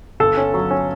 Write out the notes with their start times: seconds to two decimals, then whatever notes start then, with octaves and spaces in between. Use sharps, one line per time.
0.20 G1 A4
0.37 C#4
0.54 F#3
0.71 C#4